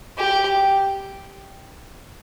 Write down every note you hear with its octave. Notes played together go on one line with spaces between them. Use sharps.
G4